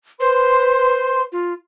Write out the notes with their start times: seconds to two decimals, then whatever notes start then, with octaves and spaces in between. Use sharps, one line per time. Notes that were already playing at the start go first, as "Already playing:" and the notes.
0.20 B4 C5 C6
1.32 F4